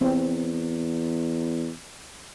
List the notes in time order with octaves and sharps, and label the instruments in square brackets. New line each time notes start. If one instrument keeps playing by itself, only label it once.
[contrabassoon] E2 [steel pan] C4